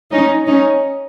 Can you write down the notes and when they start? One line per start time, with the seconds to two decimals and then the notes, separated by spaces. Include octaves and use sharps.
0.12 C#4 D#4
0.46 C#4 D#4